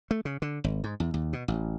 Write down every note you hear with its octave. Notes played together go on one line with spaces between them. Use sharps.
A3
C#3
D3
G#1
G#2
E2
D#2
B2
A1